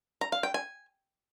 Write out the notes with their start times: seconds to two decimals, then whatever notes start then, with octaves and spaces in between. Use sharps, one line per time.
0.21 A#5
0.32 F5
0.43 G5
0.54 G#5